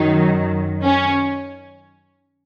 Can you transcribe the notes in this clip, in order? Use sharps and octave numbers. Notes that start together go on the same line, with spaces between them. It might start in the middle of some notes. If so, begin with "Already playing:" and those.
Already playing: F#2 D#3 F#3 D#4
C#4